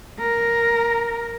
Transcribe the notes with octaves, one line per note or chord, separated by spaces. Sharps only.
A#4